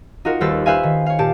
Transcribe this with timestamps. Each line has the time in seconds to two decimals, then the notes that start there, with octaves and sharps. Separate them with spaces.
0.25 D#4 F4 F#4 A#4
0.41 D#2 G3 B4 C5 E6 A6
0.66 B4 C5 E5 F5 G#5
0.83 D#3
1.06 C#5 F5
1.19 A#2 G4 A5 D7